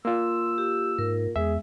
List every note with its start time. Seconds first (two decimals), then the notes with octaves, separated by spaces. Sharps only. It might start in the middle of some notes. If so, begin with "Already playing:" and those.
0.05 A#3 F4 C6 E6
0.58 G4
0.99 G#2 A#4
1.36 E2 G#3 G#4 E5